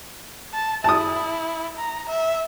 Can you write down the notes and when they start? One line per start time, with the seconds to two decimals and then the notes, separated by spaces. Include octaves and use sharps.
0.54 A5
0.84 E4 A5 D#6
1.78 A#5
2.09 E5